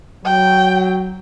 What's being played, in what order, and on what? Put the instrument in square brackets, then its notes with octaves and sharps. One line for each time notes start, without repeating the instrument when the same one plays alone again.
[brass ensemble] F#3 [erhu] G5